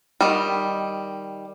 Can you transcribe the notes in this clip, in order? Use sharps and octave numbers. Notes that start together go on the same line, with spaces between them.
D#3 G3